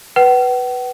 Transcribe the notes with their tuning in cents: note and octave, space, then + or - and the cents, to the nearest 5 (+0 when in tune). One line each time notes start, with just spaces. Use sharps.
B4 +0 F#5 +45